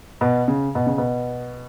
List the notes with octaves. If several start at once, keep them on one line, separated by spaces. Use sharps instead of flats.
B2
C#3
B2
C#3
B2